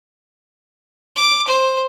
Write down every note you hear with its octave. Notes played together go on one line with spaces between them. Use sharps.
D6
C5